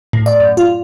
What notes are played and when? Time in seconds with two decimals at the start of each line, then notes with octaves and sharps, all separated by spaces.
0.13 A2
0.26 D5
0.40 F#2
0.57 F4